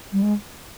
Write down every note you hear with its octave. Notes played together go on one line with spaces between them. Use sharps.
G3
G#3